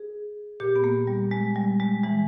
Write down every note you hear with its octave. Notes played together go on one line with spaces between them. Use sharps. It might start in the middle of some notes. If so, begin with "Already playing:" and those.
Already playing: G#4
A#2 G4
B3
A#3
G3
G#3
G3
G#3
E3 G#3